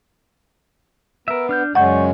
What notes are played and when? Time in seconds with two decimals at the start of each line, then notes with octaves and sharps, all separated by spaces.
1.28 B3 A#4 E5
1.49 D4 F6 G6
1.75 F#2 C#3 G#3 D5 F#5 C#6 G6